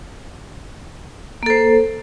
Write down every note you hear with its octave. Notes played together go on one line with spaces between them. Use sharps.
A#3 A4 C5